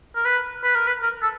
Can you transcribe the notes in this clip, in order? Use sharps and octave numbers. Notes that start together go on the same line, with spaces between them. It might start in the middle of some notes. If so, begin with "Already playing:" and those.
A#4
B4
B4
A#4
B4
A#4
A4